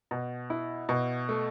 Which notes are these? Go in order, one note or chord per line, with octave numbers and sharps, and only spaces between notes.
B2
E4
B2
A3